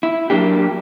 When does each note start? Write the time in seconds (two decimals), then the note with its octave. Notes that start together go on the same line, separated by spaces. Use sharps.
0.03 E4
0.30 F#3 A#3 D4 G4